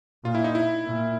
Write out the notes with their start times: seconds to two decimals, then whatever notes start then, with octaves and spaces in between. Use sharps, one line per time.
0.24 A#2 F4
0.35 E4
0.44 D#4
0.55 E4
0.86 A#2